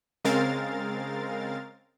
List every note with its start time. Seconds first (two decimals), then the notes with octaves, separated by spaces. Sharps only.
0.25 C#3 G#3 C4 A#4 F5 A6